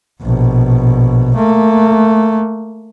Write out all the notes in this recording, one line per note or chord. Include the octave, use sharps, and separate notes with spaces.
A#1 B2
A3 A#3